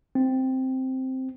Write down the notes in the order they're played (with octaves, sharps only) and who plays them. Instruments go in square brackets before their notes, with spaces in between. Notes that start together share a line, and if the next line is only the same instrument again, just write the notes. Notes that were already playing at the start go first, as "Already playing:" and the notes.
[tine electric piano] C4